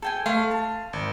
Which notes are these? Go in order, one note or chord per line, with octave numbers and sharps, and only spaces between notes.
A4 G5 G#5
A3 F5 C6
A5
G#1